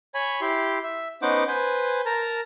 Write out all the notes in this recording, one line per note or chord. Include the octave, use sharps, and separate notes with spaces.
C#5 G#5 B5
E4 G4 C6
E5
B3 C#4 D#4 C5 F#5 D6
B4 C5 G#5
A#4 A5 A#5